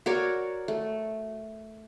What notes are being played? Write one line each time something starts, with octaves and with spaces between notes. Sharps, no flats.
F#4 A#4 C#5 D5
A3